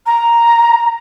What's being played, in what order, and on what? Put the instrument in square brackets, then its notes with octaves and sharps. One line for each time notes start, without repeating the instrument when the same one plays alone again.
[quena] A#5